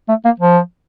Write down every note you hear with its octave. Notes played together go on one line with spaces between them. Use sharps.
A3
A#3
F3